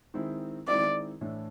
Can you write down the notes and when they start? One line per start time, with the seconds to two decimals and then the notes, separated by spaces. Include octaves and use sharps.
0.14 D#3 G#3 C4 E4
0.68 D#3 G#3 C4 E4 D5
1.21 A2 E3 A3 D4